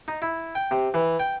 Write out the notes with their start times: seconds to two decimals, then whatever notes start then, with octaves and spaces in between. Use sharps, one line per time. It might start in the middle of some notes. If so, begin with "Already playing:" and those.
0.08 D#4
0.22 E4
0.55 G5
0.71 C3
0.94 E3
1.20 G5